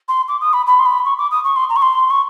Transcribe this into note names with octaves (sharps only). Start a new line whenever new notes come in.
C6
D6
D#6
B5
B5
C6
B5
C#6
D6
D#6
C#6
C6
A#5
C#6
C6
C#6